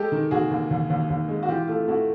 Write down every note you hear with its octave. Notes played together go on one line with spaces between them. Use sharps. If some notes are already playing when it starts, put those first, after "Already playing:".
Already playing: G#3 G4 A4
D#3
D#2 F#4 G#4
D#2
D#2
D#2
D#2
G#3
F#4
E3 F4 G4
A3 F4
A3 E4 F#4